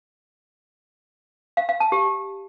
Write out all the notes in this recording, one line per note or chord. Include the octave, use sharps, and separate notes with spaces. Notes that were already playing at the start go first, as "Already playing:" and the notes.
F5
F5
A5
G4